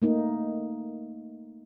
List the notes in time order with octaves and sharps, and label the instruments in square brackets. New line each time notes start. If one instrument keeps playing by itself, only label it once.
[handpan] A3 A#3 D#4